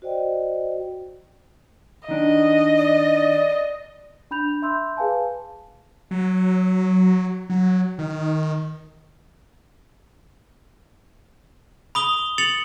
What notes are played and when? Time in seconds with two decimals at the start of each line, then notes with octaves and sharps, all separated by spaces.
0.02 F#4 C5 D5 D#5 G5
2.09 D#3 D4 D#5
2.78 D5
4.31 D4 B5 G6 F7
4.62 E5 B5 C6 E6 G6
4.97 G#4 B4 F5 G#5 A5
6.11 F#3
7.50 F#3
7.99 D#3
11.95 B5 D#6 G7
12.38 A6 C#7 F7 F#7